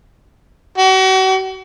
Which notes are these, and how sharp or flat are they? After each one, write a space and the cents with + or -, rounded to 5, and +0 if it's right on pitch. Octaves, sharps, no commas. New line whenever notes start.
F#4 +40